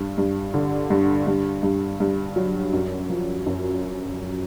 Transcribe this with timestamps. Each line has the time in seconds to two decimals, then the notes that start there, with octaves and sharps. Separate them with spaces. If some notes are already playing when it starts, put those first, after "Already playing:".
Already playing: G2
0.18 G2
0.54 D3
0.90 G2
1.27 G2
1.63 G2
2.00 G2
2.36 F#3
2.73 F#2
3.10 F3
3.46 F#2